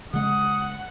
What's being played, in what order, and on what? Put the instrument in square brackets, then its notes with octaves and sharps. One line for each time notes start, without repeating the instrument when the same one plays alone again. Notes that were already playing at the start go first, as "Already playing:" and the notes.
[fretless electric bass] C#3 G#3 [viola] F#5 [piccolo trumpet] D#6